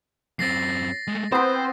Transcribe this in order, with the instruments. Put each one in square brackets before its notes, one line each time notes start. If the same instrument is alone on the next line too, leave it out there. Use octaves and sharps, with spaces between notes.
[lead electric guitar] F#2 C4 [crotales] A6 A#6 C7
[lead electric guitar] G#3 A3
[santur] B3 B4 [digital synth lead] C4 [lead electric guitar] C5